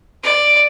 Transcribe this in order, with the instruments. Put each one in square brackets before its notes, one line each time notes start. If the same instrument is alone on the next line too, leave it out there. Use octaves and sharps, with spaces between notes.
[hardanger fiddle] D5